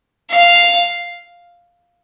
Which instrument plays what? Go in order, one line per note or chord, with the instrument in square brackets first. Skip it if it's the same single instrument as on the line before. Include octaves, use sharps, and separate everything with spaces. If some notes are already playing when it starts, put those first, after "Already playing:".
[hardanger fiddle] F5